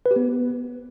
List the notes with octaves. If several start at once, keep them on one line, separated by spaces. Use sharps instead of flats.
B4
G4
B3